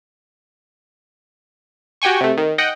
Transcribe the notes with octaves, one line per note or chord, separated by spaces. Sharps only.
F#4 G4 G5 G#5 C#6
C3 A3
D#3
D#5 F#5 G5